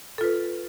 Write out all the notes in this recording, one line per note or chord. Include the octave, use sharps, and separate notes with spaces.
F4 A4 B4